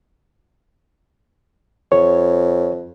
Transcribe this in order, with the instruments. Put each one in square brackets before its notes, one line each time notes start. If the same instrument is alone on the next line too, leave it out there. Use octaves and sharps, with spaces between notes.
[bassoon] F2 [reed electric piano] C#5